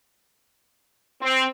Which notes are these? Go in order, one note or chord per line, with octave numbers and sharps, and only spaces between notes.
C4